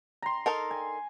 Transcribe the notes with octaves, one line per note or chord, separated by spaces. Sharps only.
A#5 C6
D#4 A4 A#4
G#5